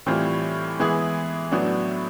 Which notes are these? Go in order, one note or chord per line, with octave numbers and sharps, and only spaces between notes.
A2 E3 G3 C4 F4
E3 G#3 B3 E4 G#4
A2 F#3 B3 D4